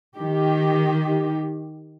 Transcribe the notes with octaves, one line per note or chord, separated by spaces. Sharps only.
D#3 G4